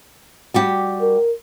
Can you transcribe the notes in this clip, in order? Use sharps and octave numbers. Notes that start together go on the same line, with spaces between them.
G3 F#4 G4
A#4